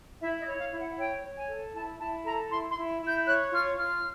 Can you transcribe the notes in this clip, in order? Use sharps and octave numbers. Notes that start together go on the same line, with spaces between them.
E4 E5
D#5
C#5
F5
E4
F#5
C#5 G5
C#5
G#5
A4
E4 A5
E4 A5
A4 A#5
E4 C6
C6
E4
E4
G6
C#5 F#6
F4 F6
F4 F6